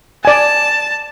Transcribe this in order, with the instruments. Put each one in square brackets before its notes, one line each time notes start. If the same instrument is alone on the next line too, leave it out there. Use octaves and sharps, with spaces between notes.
[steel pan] D5 G#5 [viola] A5